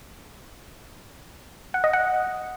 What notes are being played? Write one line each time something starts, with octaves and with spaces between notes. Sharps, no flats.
F#5
D#5
F#5